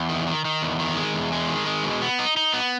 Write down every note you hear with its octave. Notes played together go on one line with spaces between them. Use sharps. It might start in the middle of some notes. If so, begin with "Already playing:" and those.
Already playing: E2
D#3
D#3
D#3
E2
D#3
G#3
E2
G#3
D#3
G#3
B2
B3
D#4
D#4
B3